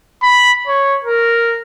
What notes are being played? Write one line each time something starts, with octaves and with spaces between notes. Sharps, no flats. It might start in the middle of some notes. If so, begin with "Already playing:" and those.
B5
C#5
A#4